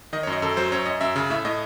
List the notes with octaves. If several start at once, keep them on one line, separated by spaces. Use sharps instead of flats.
D#3 D#5
F#2 C#5
D#5
F#2 A4
F#3 C5
F#2 C#5
F#2 D#5
F#2 E5
C#3
A2 E5
A2 D#5